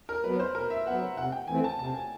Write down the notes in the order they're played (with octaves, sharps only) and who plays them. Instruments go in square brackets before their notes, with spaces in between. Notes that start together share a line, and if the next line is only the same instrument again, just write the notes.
[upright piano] A#4
[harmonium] F#3 B3 [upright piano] B4
[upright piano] C5
[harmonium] B2 [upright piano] A#4
[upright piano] E5
[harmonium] B3 [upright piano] F#5
[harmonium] F#3
[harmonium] C3 [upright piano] F#5
[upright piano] G5
[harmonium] E3 A3 C4 [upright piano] G#5
[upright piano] A5
[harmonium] C3 [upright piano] A5
[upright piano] G#5